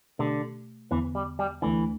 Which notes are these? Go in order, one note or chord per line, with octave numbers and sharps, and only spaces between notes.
B2 D3 A3 G4
E2 D3 E3 B3
G3
G3
D2 D3 E3 A3 D4